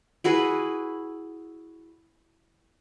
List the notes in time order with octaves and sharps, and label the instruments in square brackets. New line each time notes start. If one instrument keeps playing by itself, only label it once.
[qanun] E4 F#4 G#4 B4